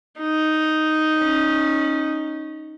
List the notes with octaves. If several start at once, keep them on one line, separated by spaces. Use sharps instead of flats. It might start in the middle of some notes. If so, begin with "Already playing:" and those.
D#4
C#4